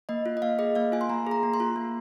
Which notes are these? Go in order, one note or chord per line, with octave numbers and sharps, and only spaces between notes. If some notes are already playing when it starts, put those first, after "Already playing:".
A#3 D#5
F4
D#5
A#3 F5
G#4 D#5
A#3 F5
F4 G#5
C6
A#3 A#5
G#4 A#5
A#3
C6
F4
A#3